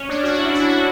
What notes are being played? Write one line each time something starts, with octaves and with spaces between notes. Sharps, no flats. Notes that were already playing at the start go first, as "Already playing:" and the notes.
Already playing: C#4
D4
F#4
D4
E4
F#4
E4